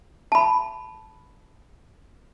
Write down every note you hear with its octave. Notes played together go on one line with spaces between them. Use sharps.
A5 B5